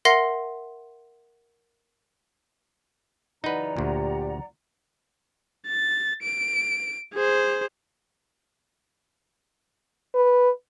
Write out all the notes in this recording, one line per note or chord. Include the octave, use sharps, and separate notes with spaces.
A#4 E5 F#5 C6 A#6 C7
F#2 C#3 E3 D#4 B4 D5 F#5 A#5
D2 A#2 G4
A6
D7
G#4 C5
B4